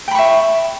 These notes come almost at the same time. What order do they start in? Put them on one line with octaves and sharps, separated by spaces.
G5 B5 C#6 E5